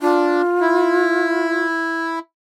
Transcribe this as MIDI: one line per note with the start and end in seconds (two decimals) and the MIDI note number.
0.01 0.42 62
0.01 1.65 65
0.61 2.19 64